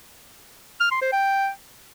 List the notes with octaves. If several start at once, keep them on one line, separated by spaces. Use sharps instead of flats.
F6
C6
C5
G5